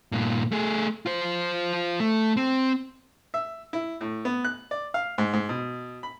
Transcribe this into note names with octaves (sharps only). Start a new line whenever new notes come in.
G2 A#2
A3 G#4
F4 C5
A3
C4
E5
E4
A2
B3
F#6
D5
F5
G#2
G#2
B2
B5